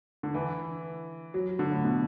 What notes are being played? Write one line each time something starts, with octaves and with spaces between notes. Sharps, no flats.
D3
E3
F#3
D3
A2
B2